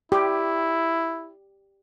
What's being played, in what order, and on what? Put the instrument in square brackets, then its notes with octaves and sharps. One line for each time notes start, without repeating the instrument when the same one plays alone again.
[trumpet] E4 [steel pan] G4